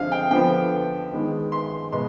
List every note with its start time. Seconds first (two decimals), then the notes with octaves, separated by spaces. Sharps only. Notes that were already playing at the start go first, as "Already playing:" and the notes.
Already playing: D3 F3 C4 G#4 F5
0.12 G5
0.31 D3 F3 B3 G5
1.12 D#3 G#3 B3
1.52 C6
1.92 B2 G#3 B3 C6